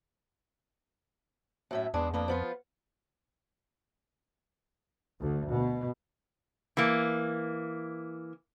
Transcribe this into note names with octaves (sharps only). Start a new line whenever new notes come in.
F#2 A2 E5
E2 G#3 B3 D4
F2 A#3 B3 D4
F3 B3 F4
D2
B2
E3 A#3